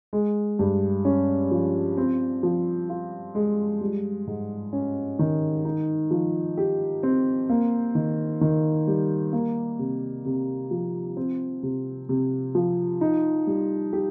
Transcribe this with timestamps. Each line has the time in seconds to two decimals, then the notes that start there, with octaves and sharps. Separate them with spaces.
0.13 G#3
0.59 G2
1.05 C#4
1.51 F3
1.97 C4
2.43 F3
2.90 F4
3.35 G#3
3.81 G3
4.27 G#2
4.73 C#4
5.19 D#3
5.65 D#4
6.11 F3
6.57 G4
7.03 C4
7.49 A#3
7.95 D#3
8.41 D#3
8.87 G3
9.33 A#3
9.79 C3
10.25 C3
10.71 F3
11.17 C4
11.63 C3
12.09 C3
12.55 F3
13.01 D#4
13.47 G3
13.93 G4